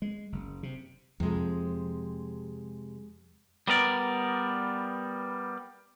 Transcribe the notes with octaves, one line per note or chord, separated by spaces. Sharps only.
G#3
F#1
C3
F2 C3 G#3
G3 B3 A#4 D5